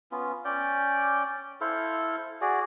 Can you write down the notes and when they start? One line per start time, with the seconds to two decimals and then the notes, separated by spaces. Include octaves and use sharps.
0.11 B3 C#4 F4
0.45 C#4 D5 G5
1.61 E4 A4 C5 F5
2.41 F#4 G#4 D5